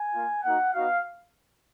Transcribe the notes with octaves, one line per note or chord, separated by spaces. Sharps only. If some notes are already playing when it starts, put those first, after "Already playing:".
Already playing: G#5
A#3 F4
A#3 D#4 F#4 F#5
B3 D#4 F#4 F5